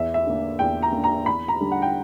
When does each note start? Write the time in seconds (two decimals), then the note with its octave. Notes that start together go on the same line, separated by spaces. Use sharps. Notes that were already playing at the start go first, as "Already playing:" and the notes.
Already playing: E2 E5
0.14 E5
0.27 D3 A#3
0.59 E2 G5
0.83 A#5
0.92 D3 A#3
1.04 A#5
1.26 E2 B5
1.48 A#5
1.61 D3 G3
1.72 F#5
1.82 G5